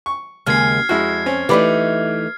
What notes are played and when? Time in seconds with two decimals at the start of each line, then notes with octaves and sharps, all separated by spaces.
0.06 C#6
0.46 D#2 C#3 G#3 F6 G#6 C7
0.89 F2 G#3 E4 F#4
1.26 C4 C#4
1.49 E3 A3 D#4 G4 D5 B5